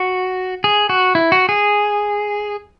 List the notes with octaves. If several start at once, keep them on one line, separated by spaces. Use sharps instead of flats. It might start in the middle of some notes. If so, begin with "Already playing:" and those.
Already playing: F#4
G#4
F#4
E4
F#4
G#4